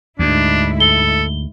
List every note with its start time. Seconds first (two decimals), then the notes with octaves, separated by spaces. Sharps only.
0.19 D2 G#2 D4 E4
0.80 A4 G7